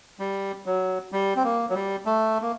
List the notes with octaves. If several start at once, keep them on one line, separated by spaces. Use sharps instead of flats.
G3
F#3
G3
C4
A#3
F#3
G3
A3
A#3